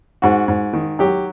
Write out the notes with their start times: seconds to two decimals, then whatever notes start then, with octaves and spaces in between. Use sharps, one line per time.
0.22 G#2 F#4
0.48 G#2
0.73 D#3
0.99 F#3 G4